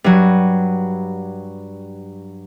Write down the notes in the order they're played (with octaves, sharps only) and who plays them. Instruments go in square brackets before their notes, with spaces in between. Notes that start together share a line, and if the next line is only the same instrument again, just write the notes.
[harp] G2 F#3